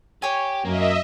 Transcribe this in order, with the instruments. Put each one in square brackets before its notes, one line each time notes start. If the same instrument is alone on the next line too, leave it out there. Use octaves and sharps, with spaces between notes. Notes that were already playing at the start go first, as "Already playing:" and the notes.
[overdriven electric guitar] G4 [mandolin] C#5 G#5
[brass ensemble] F#2 [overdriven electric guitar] A#3 [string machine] D#5 E5